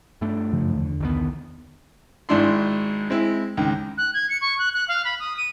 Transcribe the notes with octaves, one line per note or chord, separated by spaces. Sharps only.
G2 A3 D4
F#2 C#3 F3
E2 D3
C2 D#3 B3
G#1 G#2 D4 E4 C6
G#3 C4 E4
C#2 D#3
F#6
G#6
C#7
C#6
F#6
F#6
F5
B5
D#6
D#7